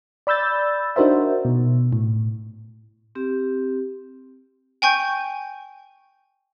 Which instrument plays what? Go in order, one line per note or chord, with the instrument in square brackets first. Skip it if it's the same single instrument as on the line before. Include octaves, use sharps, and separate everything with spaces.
[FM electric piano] D5 B5 E6 G6 A6
D4 D#4 F#4 A#4 C5 E5
B2
A2
[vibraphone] C4 G4
[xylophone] G5 G#5 C#6 G6